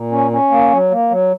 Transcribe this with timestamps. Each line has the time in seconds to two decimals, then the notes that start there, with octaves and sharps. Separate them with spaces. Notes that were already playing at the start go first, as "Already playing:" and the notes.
Already playing: A#2
0.11 C#4
0.31 C#4
0.51 A#3
0.71 F#3
0.91 A#3
1.10 F#3